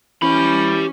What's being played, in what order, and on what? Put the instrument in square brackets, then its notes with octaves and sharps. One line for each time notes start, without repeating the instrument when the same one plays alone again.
[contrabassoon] E3 [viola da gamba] C#4 [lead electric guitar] G4 B5